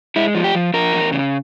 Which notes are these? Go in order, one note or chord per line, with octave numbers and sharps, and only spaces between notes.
G#3 E4
F3
G4
F3
F3 A#4
E2
C#3